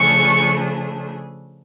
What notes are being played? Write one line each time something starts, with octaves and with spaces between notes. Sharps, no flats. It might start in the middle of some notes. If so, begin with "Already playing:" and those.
Already playing: C#3 F3 A3 D4 G#4 C#6